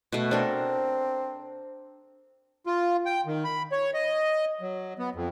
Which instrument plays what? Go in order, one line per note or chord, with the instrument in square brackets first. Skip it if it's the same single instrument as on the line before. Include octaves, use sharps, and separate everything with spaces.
[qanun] B2 A3
[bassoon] C4 [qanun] D4 A4 A#4
[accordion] F4
G5
D#3
B5
C#5
D#5
F#3
B3
F2